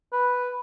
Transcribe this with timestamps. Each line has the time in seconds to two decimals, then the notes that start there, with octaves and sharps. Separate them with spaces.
0.13 B4